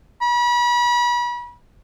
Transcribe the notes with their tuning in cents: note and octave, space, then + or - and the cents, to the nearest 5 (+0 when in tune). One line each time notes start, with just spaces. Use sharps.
B5 -35